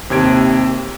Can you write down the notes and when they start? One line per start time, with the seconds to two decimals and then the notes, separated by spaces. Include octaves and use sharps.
0.10 D#2 C3 G#6 D7